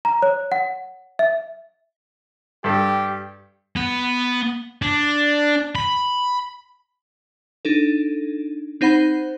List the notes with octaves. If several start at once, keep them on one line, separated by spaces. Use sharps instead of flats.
A#5
C#5
F#5
E5
G2 G4 A4
B3
D4
B5
D4 D#4 A4
C4 D#4 C5 F#5 B5